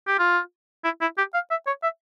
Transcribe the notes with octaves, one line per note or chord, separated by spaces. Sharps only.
G4
F4
E4
E4
G4
F5
E5
C#5
E5